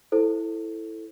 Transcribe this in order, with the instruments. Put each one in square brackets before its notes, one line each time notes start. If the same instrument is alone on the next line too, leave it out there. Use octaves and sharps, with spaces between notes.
[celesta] E4 A4 C5